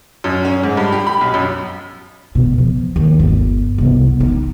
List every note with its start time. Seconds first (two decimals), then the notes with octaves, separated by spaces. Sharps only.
0.24 F#2
0.45 C#4
0.63 G#2
0.77 G2
0.92 G4
1.07 B5
1.21 B1
1.34 F#2
2.35 B2
2.58 F3
2.96 D#2
3.19 G1
3.78 C2 B3
4.20 D#4 E4